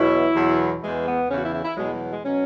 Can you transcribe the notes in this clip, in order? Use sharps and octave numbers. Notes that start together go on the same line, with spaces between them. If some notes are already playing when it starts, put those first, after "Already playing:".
Already playing: E2 B2 F#3 E4
E2 B2 F#3
E2 E3 G#3
B3
E2 C#3 E3 C#4
F#4
E4
E4
E4
E2 B2 F#3 G#3
F#3
G#3
B2 F#3 C#4